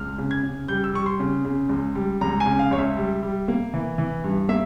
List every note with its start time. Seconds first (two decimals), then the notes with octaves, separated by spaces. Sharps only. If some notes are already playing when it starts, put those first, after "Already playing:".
Already playing: C#2 F6
0.18 C#3
0.31 G#6
0.43 C#3
0.68 G3 G6
0.84 E6
0.94 G3 C#6
1.06 C6
1.20 C#3
1.45 C#3
1.69 C#2
1.95 G3
2.21 C#2 A#5
2.40 G#5
2.46 C#3
2.59 F5
2.71 C#2 C#5
2.78 E5
2.97 G3
3.22 G3
3.48 A#3
3.74 E3
3.98 E3
4.24 G2
4.49 A#3 E5